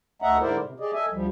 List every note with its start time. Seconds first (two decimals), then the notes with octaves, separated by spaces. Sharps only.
0.22 D2 A3 D#5 E5 F#5 A#5
0.40 G#2 D3 E4 A#4 C5 D5
0.63 C3
0.80 G4 G#4 D5 D#5
0.93 A4 D#5 E5 G#5
1.12 D2 F3 G3